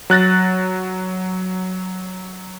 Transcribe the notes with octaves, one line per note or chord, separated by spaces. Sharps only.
F#3 F#6 A6 A#6